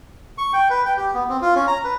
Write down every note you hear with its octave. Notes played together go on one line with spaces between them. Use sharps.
C#6
G5
B4
G5
G4
B3
C4
F4
C#4
A#5
B4